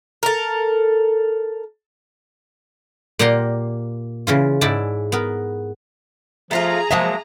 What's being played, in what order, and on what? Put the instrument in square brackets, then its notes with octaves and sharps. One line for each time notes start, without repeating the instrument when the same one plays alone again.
[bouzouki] A4 A#4
[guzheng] A#2 A#3 G4 F#5 A#5 C6
C#3 E3 F4
G#2 E3 E4 D5 A5
B3 A#4
[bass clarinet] F3 [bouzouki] A3 F4 F5 [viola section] G#4 A#5
[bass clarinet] F3 [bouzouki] F#3 G#3 A#3 [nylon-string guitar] E5 F5 A5